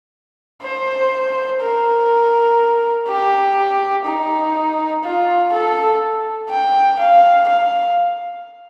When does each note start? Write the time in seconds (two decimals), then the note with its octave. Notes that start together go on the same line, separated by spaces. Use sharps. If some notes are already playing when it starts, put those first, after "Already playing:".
0.62 C5
1.61 A#4
3.07 G4
4.05 D#4
5.03 F4
5.52 A4
6.50 G5
6.99 F5
7.48 F5